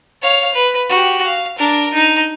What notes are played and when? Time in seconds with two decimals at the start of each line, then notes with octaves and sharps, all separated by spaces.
0.22 C#5 F5
0.54 B4
0.90 F#4 G4
1.26 F5
1.58 D4 A#4
1.94 D#4